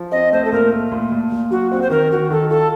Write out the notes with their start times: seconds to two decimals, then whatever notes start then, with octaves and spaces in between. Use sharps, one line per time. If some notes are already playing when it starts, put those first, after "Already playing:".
Already playing: F3
0.11 C4 D#5
0.32 A3 C5
0.45 A4
0.52 A#2 A#4
0.72 A3
0.92 A#2
1.12 A#2
1.32 A#2
1.51 F#3 F#4
1.72 C4 F#4
1.82 C5
1.90 D#3 A#4
2.10 D#3 F#4
2.30 D#3 A4
2.50 F4 A4